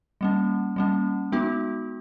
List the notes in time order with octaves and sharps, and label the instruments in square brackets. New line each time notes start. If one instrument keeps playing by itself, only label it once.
[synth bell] G3 A#3 C#4
G3 A#3 C#4
G#3 B3 D#4 F#4